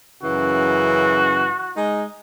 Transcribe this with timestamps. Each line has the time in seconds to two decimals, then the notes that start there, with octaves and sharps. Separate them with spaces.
0.23 F#2 C#3 E3 F#4
1.76 G#3 D#4